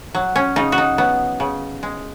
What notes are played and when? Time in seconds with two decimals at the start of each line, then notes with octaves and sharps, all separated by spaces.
0.15 F#3
0.36 C#4
0.56 C#3 D#4
0.72 F#4
0.78 D#4
0.98 F#3 B3
1.40 C#3
1.83 G#3